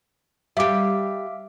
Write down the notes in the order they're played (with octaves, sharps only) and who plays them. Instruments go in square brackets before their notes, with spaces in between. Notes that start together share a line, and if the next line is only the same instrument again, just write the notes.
[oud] G3 G4 [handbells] E5 F5 D6